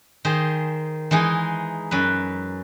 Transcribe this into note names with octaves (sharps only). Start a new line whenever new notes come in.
D#3 G#4 C5
E3 G#3 D#4 G#4
F#2 B4